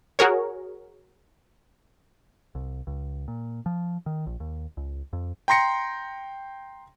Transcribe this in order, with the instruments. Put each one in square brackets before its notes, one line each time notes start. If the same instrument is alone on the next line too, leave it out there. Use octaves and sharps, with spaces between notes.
[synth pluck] F#4 G#4 A#4 C#5
[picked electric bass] C2
C#2
A#2
F3
D#3
A#1
D#2
C#2
F2
[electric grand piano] G5 A#5 C6 A#6 C#7